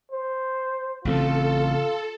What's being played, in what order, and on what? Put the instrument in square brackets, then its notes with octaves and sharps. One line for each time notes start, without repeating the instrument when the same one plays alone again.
[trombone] C5
[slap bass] A1 C#3 C4 [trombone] F4 [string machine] A4